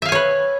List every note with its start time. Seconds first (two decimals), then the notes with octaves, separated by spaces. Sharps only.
0.02 E5
0.05 F5
0.09 G#5
0.12 C#5
0.15 B4